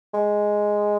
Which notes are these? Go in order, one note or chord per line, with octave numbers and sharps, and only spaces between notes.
G#3